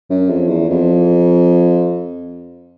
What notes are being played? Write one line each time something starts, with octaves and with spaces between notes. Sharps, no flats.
F#2
F2
E2
F2